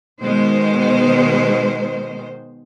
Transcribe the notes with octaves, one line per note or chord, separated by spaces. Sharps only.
B2 D#3 G#3 C5